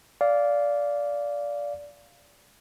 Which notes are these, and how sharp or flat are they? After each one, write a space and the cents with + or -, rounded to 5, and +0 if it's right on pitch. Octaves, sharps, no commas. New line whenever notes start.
D5 -15 F5 +0